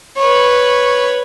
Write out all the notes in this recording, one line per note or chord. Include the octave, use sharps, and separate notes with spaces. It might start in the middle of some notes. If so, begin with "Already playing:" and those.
B4 C#5